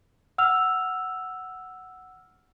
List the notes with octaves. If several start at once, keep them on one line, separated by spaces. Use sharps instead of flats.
F#5 E6 F6 F7